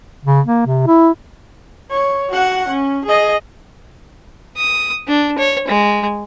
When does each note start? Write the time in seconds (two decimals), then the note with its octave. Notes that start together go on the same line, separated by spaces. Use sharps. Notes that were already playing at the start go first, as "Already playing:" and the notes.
0.25 C#3
0.46 A#3
0.66 C3
0.87 E4
1.91 C#5
2.30 F#4 F#5
2.68 C#4
3.05 G#4 D#5
4.57 D#6
5.08 D4
5.38 C#5
5.68 G#3